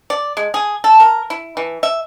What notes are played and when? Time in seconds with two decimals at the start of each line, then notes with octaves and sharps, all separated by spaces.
0.10 D5
0.37 G#3
0.54 G#4
0.84 A4
1.00 A#4
1.30 E4
1.57 E3
1.83 E5